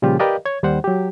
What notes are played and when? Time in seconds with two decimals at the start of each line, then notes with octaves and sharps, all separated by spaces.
0.02 A#2 C#3 F3 G3 F4 G4
0.19 G4 A#4 B4 D5 D#5 F5
0.45 C#5 G#6
0.63 D#2 G3 C5 F#5
0.84 F#3 G4